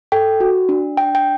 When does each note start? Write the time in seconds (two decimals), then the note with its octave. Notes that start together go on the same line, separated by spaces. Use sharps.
0.12 A4 G5
0.40 F#4
0.69 D4
0.97 D4 G5
1.15 G5